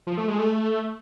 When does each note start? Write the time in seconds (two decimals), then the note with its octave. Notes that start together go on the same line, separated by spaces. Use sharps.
0.07 F3
0.17 A3
0.28 G#3
0.39 A3